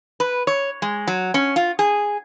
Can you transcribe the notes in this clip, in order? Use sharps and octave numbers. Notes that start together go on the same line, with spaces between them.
B4
C#5
G#3
F#3
C#4
F4
G#4